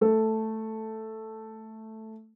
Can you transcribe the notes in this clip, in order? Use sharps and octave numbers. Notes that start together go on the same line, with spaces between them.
A3 A4